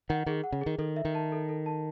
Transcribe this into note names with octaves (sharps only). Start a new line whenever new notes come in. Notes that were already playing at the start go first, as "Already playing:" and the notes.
D#3 F#5
D#3 G#4
F#5
C#3
D#3 G#4
D#3 A4
E5
D#3
A5
A4
A4
A5